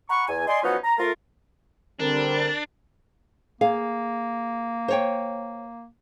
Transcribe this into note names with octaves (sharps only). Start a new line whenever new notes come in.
F#5 A#5 B5 C#6
E2 G#5
D5 D#5 G#5 C6
F3 F#3 B3 C#4 D#4 F#4
A#5
A3 F4 A#4
D3 G3 C4 D4 A#4
A#3 G#4 F5
C5 C#5 G5